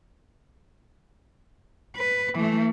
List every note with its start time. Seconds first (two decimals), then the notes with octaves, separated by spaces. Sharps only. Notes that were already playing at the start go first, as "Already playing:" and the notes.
1.96 B4
2.35 E3 A3